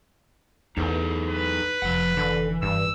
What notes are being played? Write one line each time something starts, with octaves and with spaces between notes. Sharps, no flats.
E2 D#4 E4 A4 C5
B4
F1 F3 F#5
D3 E3
G2 E6